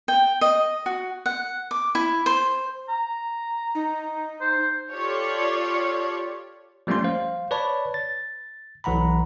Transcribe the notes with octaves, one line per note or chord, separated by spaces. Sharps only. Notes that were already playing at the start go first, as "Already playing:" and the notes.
G5
D#5
F#4
F#5
D6
E4
C5
A#5
D#4
C5
F4 G4 A4 C#5 D5
F3 G3 A3 A#3 C#4 C6
C5 F5
B4 C#5 D5 A5 B5
A6
B1 E3 F#5 A#5 B5